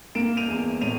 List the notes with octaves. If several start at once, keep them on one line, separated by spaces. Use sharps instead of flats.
A#3 D7 E7
D#7 F7
E2
A2 D#7 F7